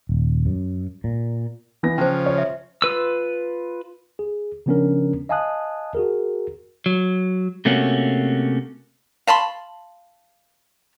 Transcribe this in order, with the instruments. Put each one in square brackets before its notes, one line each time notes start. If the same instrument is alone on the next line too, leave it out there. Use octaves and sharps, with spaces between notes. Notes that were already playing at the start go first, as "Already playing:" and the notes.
[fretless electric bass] D#1
F#2
A#2
[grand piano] E3 B3 A#6
[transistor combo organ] C#3 F3 [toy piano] C#4 C5 [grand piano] A5
[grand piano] C#5
[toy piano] E5
[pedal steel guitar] F4 B4 E6
[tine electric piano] G#4
C#3 F3 B3 C#4 D4 A#4
D#5 F5 G#5 A5 D#6 F#6
F#4 G#4 A#4
[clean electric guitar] F#3
C3 A3 A#3 C#4 F#4
[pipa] F5 A5 B5 C6